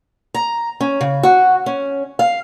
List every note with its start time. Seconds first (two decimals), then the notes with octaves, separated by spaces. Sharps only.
0.34 A#5
0.81 C#4
1.01 C#3
1.23 F#4
1.66 C#4
2.19 F5